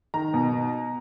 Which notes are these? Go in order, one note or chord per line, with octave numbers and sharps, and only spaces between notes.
D#3 A#5
B2